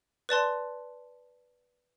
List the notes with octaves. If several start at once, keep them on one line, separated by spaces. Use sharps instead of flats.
B4 D5 A5 C6